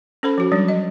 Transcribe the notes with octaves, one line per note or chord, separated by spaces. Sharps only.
C#4 A4 C5 B5
F3 F#4
F#3 G3 D4
D#5